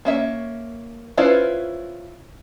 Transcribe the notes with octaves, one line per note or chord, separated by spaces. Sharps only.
A#3 C#4 E5
C#4 E4 F4 B4 C5